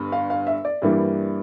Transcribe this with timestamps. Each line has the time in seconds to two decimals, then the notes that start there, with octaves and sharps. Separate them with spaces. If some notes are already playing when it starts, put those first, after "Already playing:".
Already playing: G1 G2
0.12 F5
0.30 F5
0.47 E5
0.65 D5
0.82 G2 E3 G3 A#3 E4